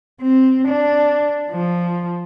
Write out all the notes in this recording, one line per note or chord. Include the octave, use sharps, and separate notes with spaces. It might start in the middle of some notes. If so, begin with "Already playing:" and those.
C4
D4
F3